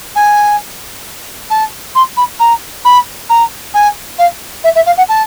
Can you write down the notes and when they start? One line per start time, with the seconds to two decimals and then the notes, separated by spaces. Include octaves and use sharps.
0.15 G#5
1.50 A5
1.95 C6
2.17 B5
2.40 A#5
2.85 B5
3.29 A#5
3.74 G#5
4.18 F5
4.64 E5
4.75 E5
4.86 F5
4.97 F#5
5.09 A5